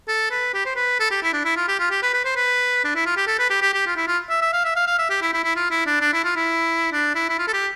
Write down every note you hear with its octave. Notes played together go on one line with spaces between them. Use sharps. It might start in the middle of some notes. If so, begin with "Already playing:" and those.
A4
B4
G4
C5
B4
A4
G4
E4
D4
E4
F4
G4
F4
G4
B4
B4
C5
B4
D4
E4
F4
G4
A4
B4
G4
G4
G4
F4
E4
F4
E5
E5
F5
E5
F5
F5
E5
G4
E4
E4
E4
F4
E4
D4
D4
E4
F4
E4
D4
E4
E4
F4
A4
G4